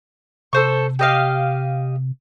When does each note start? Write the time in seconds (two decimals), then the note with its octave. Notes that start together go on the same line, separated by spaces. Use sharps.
0.53 C3 A4 C5 C#6
0.99 G4 D#5 F5